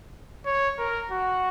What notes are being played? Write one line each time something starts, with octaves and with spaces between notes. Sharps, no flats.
C#5
A#4
F#4